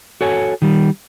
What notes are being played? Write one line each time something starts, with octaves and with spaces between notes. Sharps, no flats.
F#4 A4 C#5 G#5
D#3 G3